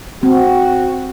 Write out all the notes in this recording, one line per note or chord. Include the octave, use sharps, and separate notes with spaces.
C4 F#4